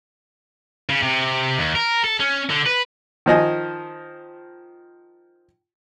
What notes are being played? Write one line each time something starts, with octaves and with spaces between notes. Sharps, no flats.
C#3
C3
D#2
A#4
A4
C#4
D3
B4
D#3 F3 D#5 G#5